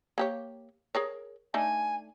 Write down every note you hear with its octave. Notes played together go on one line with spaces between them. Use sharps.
A#3 G4 C#5
G#4 A#4 C#5
A3 D4 D#4 G#5